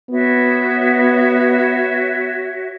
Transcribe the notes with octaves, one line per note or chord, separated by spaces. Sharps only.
B3 F#4 C#5 E5